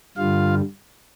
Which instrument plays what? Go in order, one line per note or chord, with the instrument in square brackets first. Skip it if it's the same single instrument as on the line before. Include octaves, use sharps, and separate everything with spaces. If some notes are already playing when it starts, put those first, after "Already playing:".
[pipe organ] G2 D3 G3 F4 F5